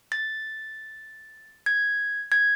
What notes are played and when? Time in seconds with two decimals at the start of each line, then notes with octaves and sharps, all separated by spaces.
0.12 A6
1.66 G#6
2.32 G#6